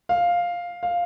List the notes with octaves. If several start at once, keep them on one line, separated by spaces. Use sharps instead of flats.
F5
F5